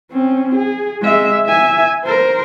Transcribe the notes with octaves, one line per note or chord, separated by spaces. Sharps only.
C4 C#4
G#4
G#3 E5
E5 G#5
A#4 C5